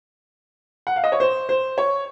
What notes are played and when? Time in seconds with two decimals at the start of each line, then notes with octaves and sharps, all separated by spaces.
0.87 F#5
0.96 F5
1.04 D#5
1.12 C#5
1.20 C5
1.49 C5
1.78 C#5